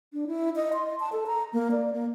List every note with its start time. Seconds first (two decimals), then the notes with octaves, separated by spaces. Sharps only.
0.13 D4
0.27 E4
0.56 D#5
0.73 C6
1.00 A5
1.12 A4
1.27 A#5
1.53 A#3
1.71 D5
1.93 A#3